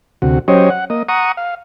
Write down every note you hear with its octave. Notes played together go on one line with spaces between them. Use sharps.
D2 C3 F#4
F#3 C#4 G4 C5 C#5 D#5
F#5
A#3 D#5
F#5 A#5 C#6 D#6
F5